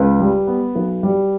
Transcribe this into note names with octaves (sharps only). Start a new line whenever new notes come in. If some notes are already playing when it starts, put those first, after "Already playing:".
Already playing: C#2 B4
G3
B3
B1
G3